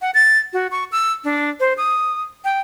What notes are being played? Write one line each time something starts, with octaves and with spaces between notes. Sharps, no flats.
F#5
A6
F#4
C#6
E6
D4
C5
D#6
G5